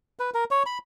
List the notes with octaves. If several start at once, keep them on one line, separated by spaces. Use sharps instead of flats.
B4
A#4
C#5
B5